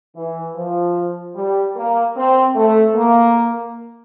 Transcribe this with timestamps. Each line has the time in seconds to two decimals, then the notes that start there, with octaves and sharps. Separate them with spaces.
0.17 E3
0.56 F3
1.36 G3
1.76 A#3
2.16 C4
2.56 A3
2.95 A#3